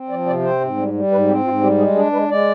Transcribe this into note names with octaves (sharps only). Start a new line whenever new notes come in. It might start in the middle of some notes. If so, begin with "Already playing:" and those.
Already playing: C4
F3 D5
C3 D5
C4 C5
G#2
G3
G3
G#2 B4
C4 G4
G#2 F4
G3 G4
G#3 G#4
D4 G#4
G#3 B4
G#3 D5